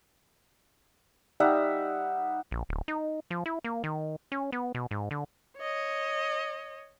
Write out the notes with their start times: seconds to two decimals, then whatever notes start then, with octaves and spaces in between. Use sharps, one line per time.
1.40 G3 D#4 E5 F#5
2.51 A#1
2.69 D1
2.88 D#4
3.31 F3
3.46 E4
3.64 A#3
3.84 D#3
4.32 C#4
4.52 B3
4.75 B2
4.91 G#2
5.11 D3
5.58 C#5 D#5